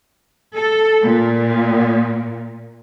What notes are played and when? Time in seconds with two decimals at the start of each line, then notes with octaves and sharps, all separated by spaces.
0.54 A4
1.03 A#2